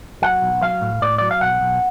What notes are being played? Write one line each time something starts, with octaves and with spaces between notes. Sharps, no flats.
F#3 F#5
B1
F#3 F5
A2
A2 D5
F#3 D5
F5
B1 F#5
B1